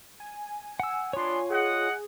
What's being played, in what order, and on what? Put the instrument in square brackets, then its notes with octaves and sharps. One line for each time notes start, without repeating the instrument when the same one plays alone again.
[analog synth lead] G#5
[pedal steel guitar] F#5 E6
[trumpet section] B3 D4 C6 [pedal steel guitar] F4 C#5
[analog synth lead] G#4 [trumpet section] D#5 F#5